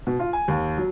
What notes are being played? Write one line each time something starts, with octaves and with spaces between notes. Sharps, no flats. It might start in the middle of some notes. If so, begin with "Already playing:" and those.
B2
F4
G#5
D#2
F#3